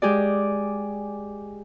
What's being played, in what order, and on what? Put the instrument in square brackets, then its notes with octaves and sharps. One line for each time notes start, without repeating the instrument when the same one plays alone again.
[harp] G#3 G4 G#4 D5